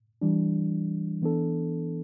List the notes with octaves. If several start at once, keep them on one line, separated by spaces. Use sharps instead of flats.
E3 G3 D4
E3 B3 D4 A4